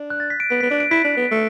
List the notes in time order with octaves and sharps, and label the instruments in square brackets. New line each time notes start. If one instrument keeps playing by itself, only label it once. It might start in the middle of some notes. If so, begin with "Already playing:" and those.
Already playing: [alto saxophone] D4
[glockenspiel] F#6
A6
B6
D7
[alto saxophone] B3 [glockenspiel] B6
[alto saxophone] B3 [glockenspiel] B6
[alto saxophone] D4 [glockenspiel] D7
[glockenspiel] D7
[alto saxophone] E4 [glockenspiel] B6
[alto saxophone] D4
B3
A3